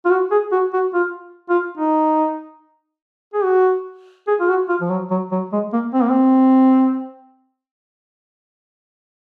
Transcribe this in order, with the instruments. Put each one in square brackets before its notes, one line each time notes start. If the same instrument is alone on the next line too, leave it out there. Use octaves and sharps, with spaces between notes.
[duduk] F4
F#4
G#4
F#4
F#4
F4
F4
D#4
G#4
F#4
G#4
F4
F#4
F4
F3
F#3
F#3
F#3
G#3
A#3
C4
A#3
C4